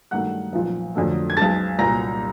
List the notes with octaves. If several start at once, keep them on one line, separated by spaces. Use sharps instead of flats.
G2 D#3 F#3 A3 F#5 F#6
B1 A#2 F3
F2 D3 F#3 A3
G#6
B1 B2 G#3 A5 A6
C2 A#2 F#3 A#5 A#6